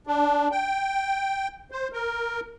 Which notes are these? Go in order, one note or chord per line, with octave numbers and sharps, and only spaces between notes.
D4
G5
C5
A#4